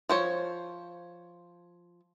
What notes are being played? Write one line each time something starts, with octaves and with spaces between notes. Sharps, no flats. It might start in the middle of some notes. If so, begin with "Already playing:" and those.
F3 C5 C#5